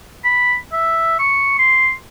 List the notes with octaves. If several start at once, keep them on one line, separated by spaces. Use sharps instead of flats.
B5
E5
C#6
C6